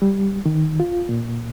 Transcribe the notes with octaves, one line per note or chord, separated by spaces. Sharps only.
G3
D#3
F4
A#2